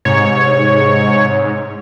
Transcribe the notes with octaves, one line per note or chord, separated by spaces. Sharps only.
G#2 C3 C#5